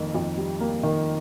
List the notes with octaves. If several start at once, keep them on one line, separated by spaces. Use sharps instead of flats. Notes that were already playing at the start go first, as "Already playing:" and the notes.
Already playing: F2 D#3 A#3
F2
G3
A#3
D#3